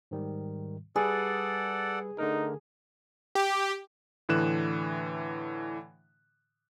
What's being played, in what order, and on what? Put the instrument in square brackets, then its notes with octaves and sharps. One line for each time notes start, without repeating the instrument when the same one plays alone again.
[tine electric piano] G#2 D#3 G3
[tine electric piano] G3 B4 [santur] G#4 [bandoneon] A4 D5 F#5
[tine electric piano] D3 A3 A#4 [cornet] D#4
[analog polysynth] G4
[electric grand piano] A2 D3 E3 F#6 E7